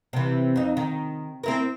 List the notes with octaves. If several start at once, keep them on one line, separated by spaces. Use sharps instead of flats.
C3 E3
F2 D#4
D#3
C4 E4 A#4